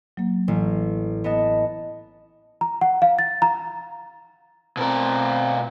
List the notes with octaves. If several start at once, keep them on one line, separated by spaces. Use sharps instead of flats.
F#3 A#3
A1
B3 D#5 A5
A#5
F#5
F5
A6
A#5
B2 C4 A#4